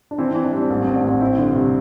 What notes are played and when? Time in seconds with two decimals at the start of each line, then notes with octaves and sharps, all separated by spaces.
0.11 D4
0.18 E3 C4
0.31 E3 C4
0.44 D4
0.52 G3 C4
0.70 A1 A#3
0.82 A1 C4
0.95 D4
1.04 A1 C4
1.21 C4 E4
1.38 G2 D3
1.55 C3 C4